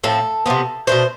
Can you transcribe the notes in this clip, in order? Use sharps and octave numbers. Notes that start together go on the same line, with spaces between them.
A2 F3 C4 A4
C3 F3 B3
B2 A3 D4 C5